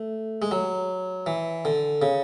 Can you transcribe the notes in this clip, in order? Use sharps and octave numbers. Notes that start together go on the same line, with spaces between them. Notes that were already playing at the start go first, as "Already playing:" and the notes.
Already playing: A3
G#3
F#3
E3
D3
C#3